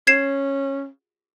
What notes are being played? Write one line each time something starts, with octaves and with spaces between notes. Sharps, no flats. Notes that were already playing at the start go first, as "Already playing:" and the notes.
C#4 G#6 C7 E7